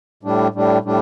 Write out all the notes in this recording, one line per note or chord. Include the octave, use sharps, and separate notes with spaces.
A2 G3 D4
A2 G3 D4
A2 G3 D4